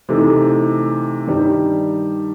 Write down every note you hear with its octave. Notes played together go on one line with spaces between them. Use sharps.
C3 E3 A3 D#4 A4
G2 D#3 G3 D#4 G4